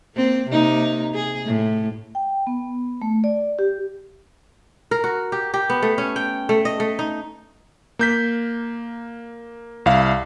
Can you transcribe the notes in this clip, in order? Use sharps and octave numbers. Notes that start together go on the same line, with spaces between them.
A#3 C4
C3 A#3 D#4
G#4
A2
G5
B3
A3
D5
G4
A#4
F#4
G4
G4
B3
A3
C#4
G5
A3
D#5
A3
D#4
A#3 G6 B6
C2 E4 F5